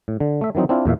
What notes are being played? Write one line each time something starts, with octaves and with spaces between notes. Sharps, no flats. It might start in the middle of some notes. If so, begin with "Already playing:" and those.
A2
D3
A3 E5
D#3 E3 F#3 C4 D#4
C4 D4 E4 F4
E2 A#2 E5 F5